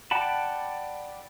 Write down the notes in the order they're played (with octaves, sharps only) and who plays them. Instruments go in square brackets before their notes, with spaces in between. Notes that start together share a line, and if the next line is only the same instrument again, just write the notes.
[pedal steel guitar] D5 F#5 G5 A5 B5